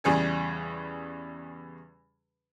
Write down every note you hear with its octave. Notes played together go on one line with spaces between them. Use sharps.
E2 C#3 G3 G#4 G#5